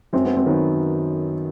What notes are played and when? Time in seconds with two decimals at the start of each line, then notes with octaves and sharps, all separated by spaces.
0.13 F#2 C4
0.25 B3
0.37 C4
0.46 D#3 F#3 B3